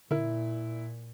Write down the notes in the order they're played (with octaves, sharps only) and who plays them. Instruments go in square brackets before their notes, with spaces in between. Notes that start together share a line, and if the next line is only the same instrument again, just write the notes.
[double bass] A#2 [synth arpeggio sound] D3 A#4 [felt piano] E4